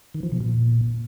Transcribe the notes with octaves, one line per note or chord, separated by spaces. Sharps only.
D#3
F3
B2
A#2